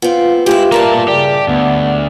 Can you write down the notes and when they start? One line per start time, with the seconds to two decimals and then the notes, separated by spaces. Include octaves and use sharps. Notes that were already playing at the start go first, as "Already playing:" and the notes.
0.02 B3 C4 F4
0.46 G#3 C4 E4 F4 G4
0.72 G2 A#3 A#4 D5 E5 A5
1.08 C#3 G4 D5
1.48 D2 B3